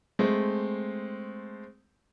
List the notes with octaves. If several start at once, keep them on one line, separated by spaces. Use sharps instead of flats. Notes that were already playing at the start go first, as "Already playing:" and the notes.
G#3 A3 C4